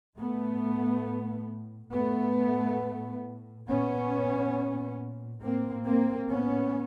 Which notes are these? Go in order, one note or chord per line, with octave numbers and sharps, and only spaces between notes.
A2 A3 B3
A2 A3 B3
A#2 B3 C#4
A2 A#3 C4
A#3 C4
B3 C#4